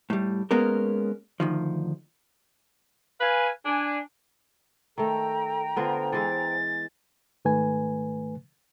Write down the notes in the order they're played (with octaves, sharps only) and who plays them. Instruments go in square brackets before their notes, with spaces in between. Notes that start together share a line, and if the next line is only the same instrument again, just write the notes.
[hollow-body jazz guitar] A2 G3
G#3 A#3 B3 C#4 A#4
D2 D#3 F3
[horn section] B4 F5 G#5
D4 G#5
[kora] D#3 A3 [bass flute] A4 [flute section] G5 A#5
[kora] D3 B3 F4 [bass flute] C5
[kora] E3 G#3 E4 [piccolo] A6
[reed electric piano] G#2 D#3 A3 B4 G#5